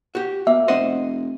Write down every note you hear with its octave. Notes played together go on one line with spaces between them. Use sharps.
F#4 G4
B2 A#3 E5
F1 C5 D#5 F#5